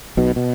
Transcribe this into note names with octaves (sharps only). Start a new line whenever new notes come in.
B1 B2
B2